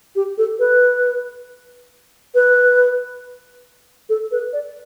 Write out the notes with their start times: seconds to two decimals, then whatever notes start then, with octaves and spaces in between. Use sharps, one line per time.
0.16 G4
0.38 A4
0.59 B4
2.35 B4
4.09 A4
4.31 B4
4.53 D5